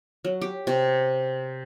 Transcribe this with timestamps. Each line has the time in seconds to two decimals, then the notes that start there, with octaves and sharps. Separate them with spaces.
0.25 F#3
0.41 G4
0.67 C3